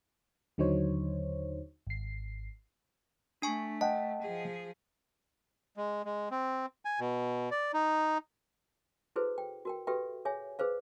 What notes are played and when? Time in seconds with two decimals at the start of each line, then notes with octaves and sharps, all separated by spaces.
0.58 D#2 D3 F#3 D#4 C5 C#5
1.87 G#1 C7
3.42 A3 D4 G#5 C#6
3.81 D#5 F#5 G5 A5
4.21 F3 G#4
5.77 G#3
6.05 G#3
6.31 C4
6.85 G#5
7.00 B2
7.51 D5
7.74 D#4
9.16 E4 F#4 G#4 A4 B4 C5
9.38 G5
9.65 F#4 A#4 G5
9.87 F#4 G4 A4 B4 E5 G5
10.25 G#4 C#5 E5 G#5
10.59 G#4 B4 C5 F5